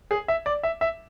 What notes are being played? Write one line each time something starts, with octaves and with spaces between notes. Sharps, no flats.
G#4
E5
D5
E5
E5